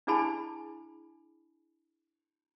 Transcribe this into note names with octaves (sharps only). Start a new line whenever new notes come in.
D4 E4 G#4 G#5 A5 B5